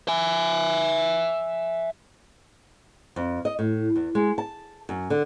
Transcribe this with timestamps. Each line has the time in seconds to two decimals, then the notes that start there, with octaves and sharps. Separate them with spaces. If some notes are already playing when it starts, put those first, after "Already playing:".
0.08 E5 G#5
3.16 F2
3.45 D#5
3.59 A2
3.96 E2
4.15 G#3
4.38 A5
4.89 F#2
5.10 D3